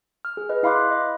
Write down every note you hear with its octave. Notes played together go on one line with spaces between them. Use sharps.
F6
G#4
B4 D#5
E4 F5 B5 C6 D6 F#6
D#5